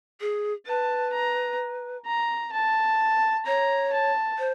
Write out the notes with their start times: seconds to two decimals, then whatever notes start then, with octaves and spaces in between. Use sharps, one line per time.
0.21 G#4
0.67 B4 A5
1.13 A#5
2.06 A#5
2.53 A5
3.46 C#5 A#5
3.93 A5
4.39 C5